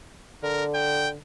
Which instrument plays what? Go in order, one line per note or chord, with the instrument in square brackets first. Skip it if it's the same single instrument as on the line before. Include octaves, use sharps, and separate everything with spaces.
[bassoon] D3 [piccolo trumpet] A#4
[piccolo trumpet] G5